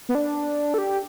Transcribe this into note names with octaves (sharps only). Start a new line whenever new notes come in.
B3
D4
A4
G4